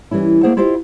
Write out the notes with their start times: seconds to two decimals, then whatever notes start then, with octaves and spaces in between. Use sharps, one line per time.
0.11 E3 G3 C#4 E4
0.43 A3 A#3 G#4 C5 F#5
0.57 E4 F4 G4 C5 D#5 F5